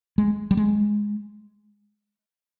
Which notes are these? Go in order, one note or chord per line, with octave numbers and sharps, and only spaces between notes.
G#3
G3
G#3